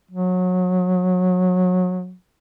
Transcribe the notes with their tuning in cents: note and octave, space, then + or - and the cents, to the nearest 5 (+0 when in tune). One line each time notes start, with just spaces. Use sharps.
F#3 -25